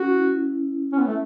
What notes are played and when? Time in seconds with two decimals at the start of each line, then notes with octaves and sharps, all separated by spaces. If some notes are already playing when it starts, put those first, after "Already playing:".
Already playing: C#4 F#4
0.08 E4
0.93 C#4
0.99 B3
1.07 A3